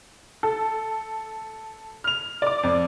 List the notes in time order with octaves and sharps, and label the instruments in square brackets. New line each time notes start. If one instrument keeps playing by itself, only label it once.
[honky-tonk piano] A4
[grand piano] F6 F7
[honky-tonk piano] D5 D6
[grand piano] F2